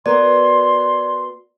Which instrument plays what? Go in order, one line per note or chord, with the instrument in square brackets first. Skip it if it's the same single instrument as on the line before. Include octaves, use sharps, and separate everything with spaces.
[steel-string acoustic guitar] B3 F#4 A#4 [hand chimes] D5 [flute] C6